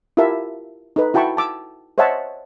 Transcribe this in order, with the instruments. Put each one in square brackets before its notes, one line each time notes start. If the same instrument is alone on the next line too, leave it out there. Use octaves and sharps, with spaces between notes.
[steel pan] E4 F4 G4 A#4 E5 A5
D#4 A4 B4
E4 F#4 G5 A5 B5 C#6
A5 D6 E6
C5 C#5 D#5 E5 F#5 A5